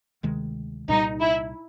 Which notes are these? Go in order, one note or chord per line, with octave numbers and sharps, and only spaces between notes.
D2 C3 D#3 G#3
C2 A#2 G3 D#4
E4